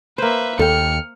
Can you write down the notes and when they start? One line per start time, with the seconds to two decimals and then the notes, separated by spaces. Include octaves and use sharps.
0.18 A#3 B4 C5 E5
0.59 D#2 A4 G5 F6 C#7